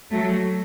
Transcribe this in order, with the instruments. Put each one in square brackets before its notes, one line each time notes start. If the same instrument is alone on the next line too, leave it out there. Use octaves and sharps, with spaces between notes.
[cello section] F#3 A3